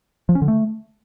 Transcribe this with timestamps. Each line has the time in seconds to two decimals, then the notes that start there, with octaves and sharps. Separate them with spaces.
0.29 F3
0.35 C#4
0.42 D3
0.48 A3